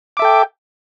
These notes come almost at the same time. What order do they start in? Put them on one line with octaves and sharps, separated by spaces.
D6 E5 A4 G5